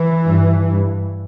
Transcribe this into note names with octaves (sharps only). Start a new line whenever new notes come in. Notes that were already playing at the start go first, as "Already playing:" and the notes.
Already playing: E3
G2
G2